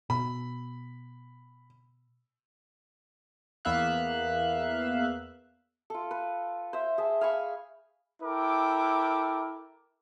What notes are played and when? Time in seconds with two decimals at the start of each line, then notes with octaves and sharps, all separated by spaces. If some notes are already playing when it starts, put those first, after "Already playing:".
0.10 B2 B5
3.65 E2 A#3 B3 E5 F5 F#6
5.90 F4 A4
6.11 B4
6.73 C5 E5
6.98 G#4 E5 A5
7.21 F5 G#5 B5 C#6
8.22 E4 A4 A#4 G5 D6